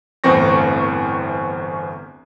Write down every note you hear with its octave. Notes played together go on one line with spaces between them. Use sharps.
G1 E2 A2 C4 C#6 A#6